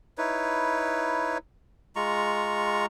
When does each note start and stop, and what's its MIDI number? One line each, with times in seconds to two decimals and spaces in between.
0.18 1.38 63
0.18 1.38 64
0.18 1.38 71
0.18 1.38 73
1.96 2.86 56
1.96 2.86 65
1.96 2.86 82
1.96 2.86 85